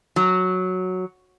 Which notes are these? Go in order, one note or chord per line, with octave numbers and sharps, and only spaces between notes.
F#3